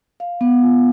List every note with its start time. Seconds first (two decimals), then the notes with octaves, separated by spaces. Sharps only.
0.20 F5
0.41 B3
0.62 F4